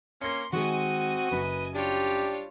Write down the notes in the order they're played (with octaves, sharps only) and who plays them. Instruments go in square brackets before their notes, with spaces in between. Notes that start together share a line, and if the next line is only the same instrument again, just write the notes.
[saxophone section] A#3 C#4 [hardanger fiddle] C6 [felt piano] A#6 C#7
[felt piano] D#3 G#3 [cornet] C4 [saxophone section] F#4 [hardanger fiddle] D#5 G#5
[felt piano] F#1 F#2 [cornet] B4
[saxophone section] G3 D4 [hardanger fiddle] F4 C#5 [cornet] G4